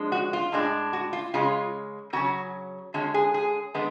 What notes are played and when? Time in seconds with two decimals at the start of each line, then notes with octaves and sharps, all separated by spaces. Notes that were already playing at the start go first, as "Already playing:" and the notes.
Already playing: F3 G#3 D4
0.12 F#4
0.33 F4
0.52 A2 G#3 D4
0.93 F#4
1.13 F4
1.34 C#3 G#3 C#4 F4
2.13 C#3 F#3 C#4 F#4
2.94 D3 G#3 C#4 F#4
3.14 G#4
3.34 G#4
3.74 D3 G#3 B3